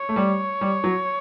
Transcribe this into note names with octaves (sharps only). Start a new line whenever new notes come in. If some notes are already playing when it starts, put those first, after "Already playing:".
Already playing: C#5
A3
G3
G3
F#3